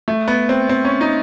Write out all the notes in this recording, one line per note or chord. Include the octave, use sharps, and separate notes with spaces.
A3
B3
C4
C4
C#4
D#4